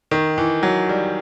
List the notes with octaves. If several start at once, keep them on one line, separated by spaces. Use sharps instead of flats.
D#3
E3
F#3
G3